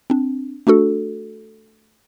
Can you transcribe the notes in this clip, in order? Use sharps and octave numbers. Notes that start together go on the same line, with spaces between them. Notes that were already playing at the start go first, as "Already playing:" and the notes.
C4 D4
A3 D4 F#4 A4